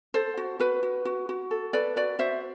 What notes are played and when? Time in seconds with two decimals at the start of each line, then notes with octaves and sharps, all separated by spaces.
0.14 A4 C5
0.37 F#4
0.60 F#4 B4
0.83 F#4
1.05 F#4
1.29 F#4
1.51 A4
1.73 A4 B4 D5
1.96 F#4 B4 D5
2.19 F#4 C5 E5